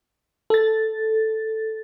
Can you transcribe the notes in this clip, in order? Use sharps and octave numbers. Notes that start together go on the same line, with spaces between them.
A4 A6